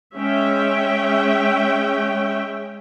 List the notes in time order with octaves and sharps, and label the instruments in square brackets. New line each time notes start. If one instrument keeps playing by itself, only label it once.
[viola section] G#3 C#4 E5 G5